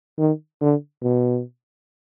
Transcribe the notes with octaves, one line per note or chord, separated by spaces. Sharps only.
D#3
D3
B2